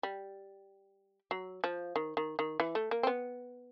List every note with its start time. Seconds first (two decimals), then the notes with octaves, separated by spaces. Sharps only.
0.03 G3
1.31 F#3
1.64 F3
1.96 D#3
2.17 D#3
2.39 D#3
2.60 E3
2.75 A3
2.91 A#3
3.03 C4
3.07 B3